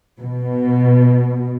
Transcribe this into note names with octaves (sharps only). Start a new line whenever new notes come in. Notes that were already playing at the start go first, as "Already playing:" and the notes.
B2